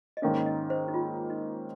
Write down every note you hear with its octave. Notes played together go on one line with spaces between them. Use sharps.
D#5
G#2 D#3 A#3 C#4 F5
D#5
C5
D#4
F4
D#4